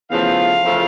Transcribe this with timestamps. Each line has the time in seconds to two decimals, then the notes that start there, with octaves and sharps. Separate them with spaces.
0.10 E2 C#3 F3 A3 F5
0.62 E2 C#3 F3 A3